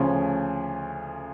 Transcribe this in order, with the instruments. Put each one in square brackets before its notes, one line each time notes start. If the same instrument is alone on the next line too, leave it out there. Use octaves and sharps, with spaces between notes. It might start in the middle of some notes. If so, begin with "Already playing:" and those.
Already playing: [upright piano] D2 C#3 F3 C#4